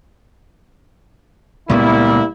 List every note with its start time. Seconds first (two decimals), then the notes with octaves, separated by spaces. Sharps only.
1.69 C#2 A#2 G3 A#3 B3 E4